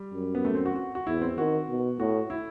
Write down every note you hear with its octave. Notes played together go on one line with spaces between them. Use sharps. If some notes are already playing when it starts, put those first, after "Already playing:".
Already playing: G3
F#2
B3
A3
C4
F#4
F#4
F#4
E2 E4
C4
D#3 F#4
B2
A2 F#4
E4